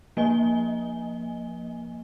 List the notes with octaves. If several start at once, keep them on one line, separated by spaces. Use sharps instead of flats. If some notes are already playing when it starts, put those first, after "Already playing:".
F3 A#3 D#5 G#5 G7